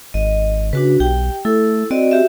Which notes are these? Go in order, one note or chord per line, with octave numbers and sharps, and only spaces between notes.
G#1 D#5
C#3 D4 F#4 B4
B1 G4 G5
A3 E4 A4
C4 F#4 D5 D#5
F#4 G4 E5